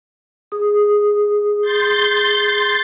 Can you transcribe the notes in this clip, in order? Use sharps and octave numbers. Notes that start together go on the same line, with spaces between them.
G#4 D#6
C6 G6 A6